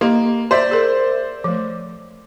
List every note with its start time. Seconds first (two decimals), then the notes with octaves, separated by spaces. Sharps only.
0.01 A#3 G4 D#5 C6
0.51 C5 D5 E5
0.71 G#4 A#4
1.44 F3 A3